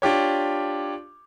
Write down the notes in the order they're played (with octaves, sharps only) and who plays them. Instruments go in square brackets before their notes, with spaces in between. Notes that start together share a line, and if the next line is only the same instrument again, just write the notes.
[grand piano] D4 F4 G4 C#5